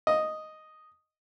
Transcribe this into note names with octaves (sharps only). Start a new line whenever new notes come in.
D#5